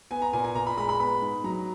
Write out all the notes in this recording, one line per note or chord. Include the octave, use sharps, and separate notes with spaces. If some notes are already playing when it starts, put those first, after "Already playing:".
B3 G#5
A#5
A#2 G#5
G#5
A#2 A#5
B5
G#3 B5
B5
B3 B5
G#2
F#3 A#5